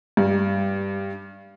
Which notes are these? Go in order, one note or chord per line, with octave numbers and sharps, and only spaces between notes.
G2